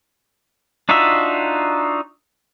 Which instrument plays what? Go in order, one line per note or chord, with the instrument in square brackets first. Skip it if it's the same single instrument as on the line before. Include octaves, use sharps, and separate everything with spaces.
[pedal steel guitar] D4 D#4 F4 F#4 E5